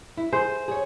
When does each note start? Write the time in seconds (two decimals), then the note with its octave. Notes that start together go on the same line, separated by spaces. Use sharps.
0.17 E4
0.33 G#4 C5
0.68 G#4 C#5